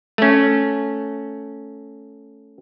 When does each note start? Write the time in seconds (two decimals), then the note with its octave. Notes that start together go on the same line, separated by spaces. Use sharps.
0.18 A3 C#4